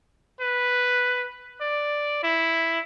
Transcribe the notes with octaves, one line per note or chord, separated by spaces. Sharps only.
B4
D5
E4